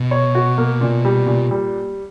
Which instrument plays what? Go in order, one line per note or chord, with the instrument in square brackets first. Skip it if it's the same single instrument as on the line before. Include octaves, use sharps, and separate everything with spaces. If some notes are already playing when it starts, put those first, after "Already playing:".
Already playing: [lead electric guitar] B2
[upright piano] C#5
F#4
A#3
A#2
G3
A#2
G3